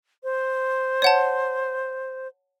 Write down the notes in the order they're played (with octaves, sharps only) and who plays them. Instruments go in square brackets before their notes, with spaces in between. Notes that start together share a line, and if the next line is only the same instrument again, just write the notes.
[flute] C5
[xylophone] C#5 F#5 A5